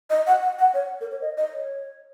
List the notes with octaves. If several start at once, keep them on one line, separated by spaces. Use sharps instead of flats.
D#5
F#5
F#5
F#5
C#5
A#4
C#5
D#5
D#5
C#5